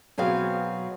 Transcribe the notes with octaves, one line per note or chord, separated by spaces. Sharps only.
B2 F#3 C4 G#4 F5